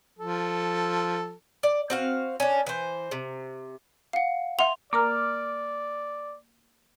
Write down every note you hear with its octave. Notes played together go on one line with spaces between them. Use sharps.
F3 A4
D5
C4 F#4 F5
C#4 D4
E3 C5
C3
F5 F#5
E5 F#5 C6 F7
A#3 A#4 D5 A#5 D6 F6